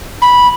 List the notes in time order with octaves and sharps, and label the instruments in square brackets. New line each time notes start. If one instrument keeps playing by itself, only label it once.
[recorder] B5